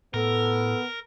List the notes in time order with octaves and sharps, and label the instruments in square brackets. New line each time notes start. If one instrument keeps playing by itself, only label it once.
[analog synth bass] A2 [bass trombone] B3 [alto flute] A4 [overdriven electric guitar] A#4